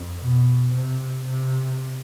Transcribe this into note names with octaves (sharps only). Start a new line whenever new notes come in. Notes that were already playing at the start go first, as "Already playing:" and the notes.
Already playing: F2
B2
C3
C3